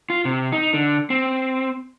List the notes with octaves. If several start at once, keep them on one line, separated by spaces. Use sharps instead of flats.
F4
C3
D#4
D3
C4